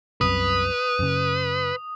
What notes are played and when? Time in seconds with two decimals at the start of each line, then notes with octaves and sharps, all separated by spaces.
0.21 C2 F#2 C3 B4 D#6
0.99 F#2 C#3